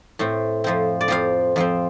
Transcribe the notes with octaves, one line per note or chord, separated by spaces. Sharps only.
A2 A3 C4
F2 F3 C4
D5
F2 F3 C4 F5
F2 F3 C4